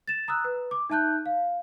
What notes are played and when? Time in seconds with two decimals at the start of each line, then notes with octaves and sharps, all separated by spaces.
0.07 A6 E7
0.28 A#5 D#6 E6 F#6
0.44 B4
0.71 D6
0.90 D#4 E5 A5 F#6 G6
1.26 F5